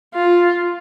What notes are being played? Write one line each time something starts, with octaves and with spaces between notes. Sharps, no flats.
F4